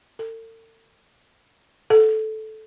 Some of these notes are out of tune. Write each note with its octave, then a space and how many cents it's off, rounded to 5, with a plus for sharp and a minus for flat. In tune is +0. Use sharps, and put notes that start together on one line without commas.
A4 +45
A4 -10